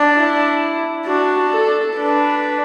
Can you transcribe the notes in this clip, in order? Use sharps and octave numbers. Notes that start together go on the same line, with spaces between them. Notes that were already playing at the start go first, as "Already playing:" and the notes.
Already playing: D4
E4
D4 F#4
A4
D4 B4